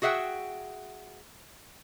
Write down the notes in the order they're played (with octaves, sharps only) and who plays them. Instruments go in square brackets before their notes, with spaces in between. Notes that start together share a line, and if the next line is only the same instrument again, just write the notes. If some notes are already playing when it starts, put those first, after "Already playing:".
[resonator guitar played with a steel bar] F#4 G#4 E5 F#5 G5